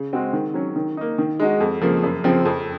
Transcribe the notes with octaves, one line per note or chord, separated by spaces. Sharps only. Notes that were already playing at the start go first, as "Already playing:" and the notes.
Already playing: C#3
G#3 C4 F#4
D#3
F#3 C#4
D#3
A#3 D#4
D#3
G#3 D#4 F#4
F2
C#3 F3 A#3
F#2
C#3 F3 C4
F2